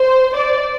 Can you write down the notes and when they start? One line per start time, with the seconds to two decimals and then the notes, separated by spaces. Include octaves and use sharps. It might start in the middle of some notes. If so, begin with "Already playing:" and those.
Already playing: C5
0.36 D5